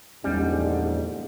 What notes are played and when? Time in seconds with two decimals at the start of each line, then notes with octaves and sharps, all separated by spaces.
0.24 A#1 E2 G#2 D3 G3 C#4